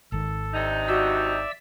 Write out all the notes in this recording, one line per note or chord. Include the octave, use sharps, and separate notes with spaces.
G#1 D#3 A4
C3 D4 D#4
F#4 D5 E5 E6